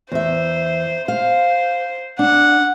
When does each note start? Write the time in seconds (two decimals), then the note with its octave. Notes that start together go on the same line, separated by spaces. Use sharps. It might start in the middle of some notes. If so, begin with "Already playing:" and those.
0.12 E2 C5 E5
1.08 C5 F5
2.19 D4 F#5